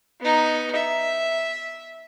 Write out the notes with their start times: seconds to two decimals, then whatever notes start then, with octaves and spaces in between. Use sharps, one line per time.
0.20 B3 D#4
0.76 E5